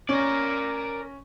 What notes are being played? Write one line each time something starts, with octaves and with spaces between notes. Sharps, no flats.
C#4 A#4 D5